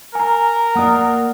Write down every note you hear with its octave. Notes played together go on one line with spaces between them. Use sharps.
A#4 G#5 A#5
A#3 D5 F#5 D#6